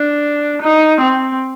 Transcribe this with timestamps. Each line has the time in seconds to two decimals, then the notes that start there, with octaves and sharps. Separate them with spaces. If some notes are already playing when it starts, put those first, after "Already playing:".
Already playing: D4
0.62 D#4
1.00 C4